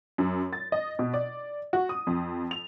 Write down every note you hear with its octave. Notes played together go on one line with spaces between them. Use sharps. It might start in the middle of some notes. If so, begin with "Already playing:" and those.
F#2
A6
D#5
B2
D5
F#4
D#6
F2
F7